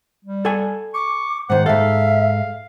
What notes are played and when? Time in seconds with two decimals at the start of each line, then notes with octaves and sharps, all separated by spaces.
0.25 G3
0.45 A4 F#5 G#5
0.94 C#6 D6
1.50 G#2 D#3 C5 F#5
1.66 G#2 A4 E5 F5